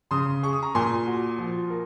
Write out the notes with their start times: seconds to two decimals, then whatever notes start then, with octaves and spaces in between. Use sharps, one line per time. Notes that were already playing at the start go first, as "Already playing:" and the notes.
0.11 C#3 C6 D#6
0.43 G#4 C#6
0.53 D#6
0.62 A#5 C#6
0.75 A#2 G#5 C6
1.07 F#4
1.39 F3
1.70 A#4